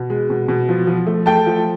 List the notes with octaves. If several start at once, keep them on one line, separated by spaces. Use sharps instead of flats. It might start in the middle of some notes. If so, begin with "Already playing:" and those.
Already playing: B2
G#3
B2
B2
F3
F3
A3
A3 G5 A5
F3